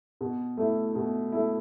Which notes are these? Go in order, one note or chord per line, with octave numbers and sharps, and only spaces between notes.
B2
A3 E4
B2
A3 E4